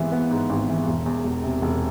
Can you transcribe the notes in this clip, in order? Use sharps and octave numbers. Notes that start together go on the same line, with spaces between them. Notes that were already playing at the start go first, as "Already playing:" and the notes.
Already playing: G#1 G#2 E3 B3
B3
G#2
G#1
E3
E1
E2
E1
C3
E1